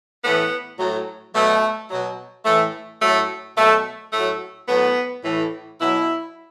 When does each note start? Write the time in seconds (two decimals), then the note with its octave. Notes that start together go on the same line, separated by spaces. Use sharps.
0.23 A2 E3 B3
0.79 A2 F#3
1.34 B2 F#3 A3
1.90 B2 F#3
2.45 A2 E3 A3
3.02 A2 F#3 A3
3.57 B2 F#3 A3
4.13 A2 F#3 A3
4.68 A2 F#3 B3
5.24 A2 E3
5.80 B2 F#3 E4